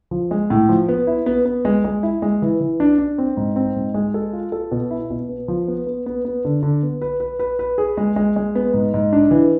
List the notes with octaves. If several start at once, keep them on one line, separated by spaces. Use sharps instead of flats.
F3
G#3
A2
F3
B3
E4
B3
B3
G#3
G#3
E4
G#3
E3
E3
D4
D4
C4
G#2
C4
G#2
G#3
A4
F4
A4
B2
E4
B2
B3
F3
B3
B3
B3
B3
D3
D3
B3
B4
B4
B4
B4
G#4
G#3
G#3
G#3
B3
G#2
G#2
D4
E3